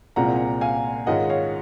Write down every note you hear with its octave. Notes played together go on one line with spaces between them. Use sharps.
C2 A#2 G#3 C4 F4 F#5 A#5
F5 G#5
G#2 D#3 G#3 C#4 F4 D#5 F#5
C#5 F5